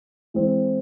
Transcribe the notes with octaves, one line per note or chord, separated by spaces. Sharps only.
E3 G#3 C4